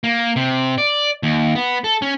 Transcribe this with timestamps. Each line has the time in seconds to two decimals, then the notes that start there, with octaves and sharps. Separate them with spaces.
0.04 A#3
0.36 C3
0.78 D5
1.23 D#2
1.55 B3
1.84 A4
2.02 C#4